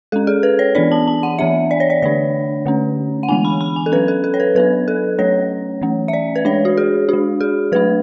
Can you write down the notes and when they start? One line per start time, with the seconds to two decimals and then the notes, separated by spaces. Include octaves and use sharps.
0.12 G#3 C#4 A4
0.27 G#4
0.43 B4
0.59 C#5
0.75 E3 B3 D4 D5
0.92 A5
1.08 A5
1.23 F#5
1.39 E3 B3 D4 E5
1.71 D5
1.80 C#5
1.90 D5
2.02 D3 A3 D4 C#5
2.66 D3 A3 C#4
3.23 F#5
3.28 E3 G#3 B3 D4 G#5
3.45 B5
3.61 B5
3.76 G#5
3.86 A4
3.92 F#3 C#4 B4
4.08 A4
4.24 A4
4.34 C#5
4.40 B4
4.55 F#3 B3 D4 B4
4.88 A4
5.18 F#3 A3 C#4 C#5
5.81 E3 A3 C#4
6.08 E5
6.13 D5
6.36 B4
6.45 G#3 D4 C#5
6.65 F#4
6.77 G#4
7.09 G#3 D4 F#4
7.41 G#4
7.72 F#3 A3 D4 B4